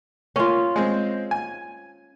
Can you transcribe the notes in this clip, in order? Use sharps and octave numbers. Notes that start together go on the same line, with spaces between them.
A#3 C#4 F4
G#3 C4
G#5